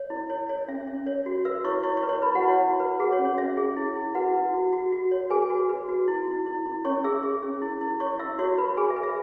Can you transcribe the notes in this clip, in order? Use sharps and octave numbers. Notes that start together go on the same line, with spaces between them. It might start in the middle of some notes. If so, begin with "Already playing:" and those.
Already playing: C#5
E4
C#5
C#5
C#4 E5
C#4
C#5
F#4
B4 E5 E6
E4 C#5 C#6
E4 C#5 C#6
C#5 C#6
B4
C#5 C#6
E4 B4 B5
F#4 F#5
E4
C#5
E4
B4
F#4 G#4 F#5
C#5
C#4
C#5
C#4 E5
G#4
E4
E4
F#4 B4 F#5
E4
F#4
F#4
F#4
C#5
G#4 B4 G#5
F#4
B4
F#4
E4
E4
E4
E4
C#4 C#5 C#6
G#4 E5 E6
G#4
C#4
E4
E4
C#5 C#6
E4 E5 E6
F#4 C#5 C#6
B4 B5
G#4 B4 G#5
E5
B4
E5